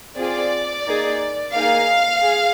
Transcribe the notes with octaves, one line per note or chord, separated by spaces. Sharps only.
C4 F4 G#4 D5
A#3 D#4 G#4
A#3 D#4 G#4 F5
G#4